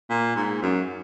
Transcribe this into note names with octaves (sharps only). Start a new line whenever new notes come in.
A#2
G#2
F#2